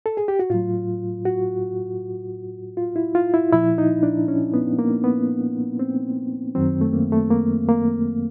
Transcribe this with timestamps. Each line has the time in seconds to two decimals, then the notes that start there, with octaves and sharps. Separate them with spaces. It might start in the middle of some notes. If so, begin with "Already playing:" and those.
0.06 A4
0.17 G#4
0.28 G4
0.40 F#4
0.50 A2 F#3 F4
1.26 F#4
2.77 F4
2.96 E4
3.15 F4
3.34 E4
3.52 A#2 F3 E4
3.78 D#4
4.03 D4
4.28 C#4
4.54 B3
4.79 A#3
5.04 B3
5.79 C4
6.55 F#2 D#3 F#3 C4
6.81 A3
6.93 A#3
7.12 A3
7.31 A#3
7.69 A#3